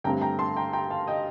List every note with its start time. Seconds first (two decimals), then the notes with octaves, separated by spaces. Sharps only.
0.04 G2 D3 A3 C4 G5 A#5
0.22 G5 A#5
0.39 A5 C6
0.57 G5 A#5
0.73 G5 A#5
0.90 F5 A5
1.07 D#5 G5